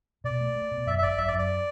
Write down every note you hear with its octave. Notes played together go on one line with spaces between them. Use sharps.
B2 D5
A3
A3
B2
F#2 E5
E5
G#1 D5
F#2 E5
D5
F#2
D5